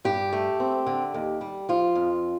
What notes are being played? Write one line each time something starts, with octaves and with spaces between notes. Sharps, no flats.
G2 G4
A3
C4
D3
D#2
G3
F3 F4
F2